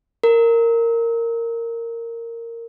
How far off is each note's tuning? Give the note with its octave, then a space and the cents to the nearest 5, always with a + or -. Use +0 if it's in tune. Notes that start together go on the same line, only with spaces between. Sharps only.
A#4 -15